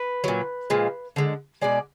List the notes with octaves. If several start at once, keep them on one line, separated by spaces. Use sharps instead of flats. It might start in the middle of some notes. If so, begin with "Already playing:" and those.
Already playing: B4
A#2 F#3
A#2 F3 G#3
D3 G#3
B2 G#3 D5